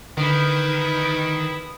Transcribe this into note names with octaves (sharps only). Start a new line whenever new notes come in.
D3 D#3 E4 B4 D#6